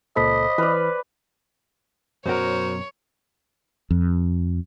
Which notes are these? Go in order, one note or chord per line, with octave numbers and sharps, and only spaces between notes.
C#2 A#2 A4 C5 D#5 B5 B6
E3 B4 D5 F6
F#2 B2 F#3 A#4 C5 C#5 F#5
F2